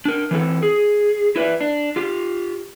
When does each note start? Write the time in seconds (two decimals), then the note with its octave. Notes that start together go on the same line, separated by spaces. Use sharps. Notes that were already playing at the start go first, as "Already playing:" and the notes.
0.05 D4 A#4
0.31 E3 C4 E4 A4
0.63 G#4
1.36 E4 B4 C5 D5 E5
1.61 D4
1.96 F4 G4